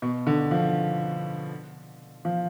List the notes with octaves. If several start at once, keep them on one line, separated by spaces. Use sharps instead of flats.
B2
D3
F3
F3